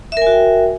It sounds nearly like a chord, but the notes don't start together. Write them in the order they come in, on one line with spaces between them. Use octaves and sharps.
E5 A#4 G#5 F#4 G5